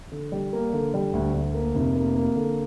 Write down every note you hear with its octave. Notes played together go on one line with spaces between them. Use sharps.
D3
G3
A#3
D3
G3
D2
D2
A#3
F1
A#3
A#3
D3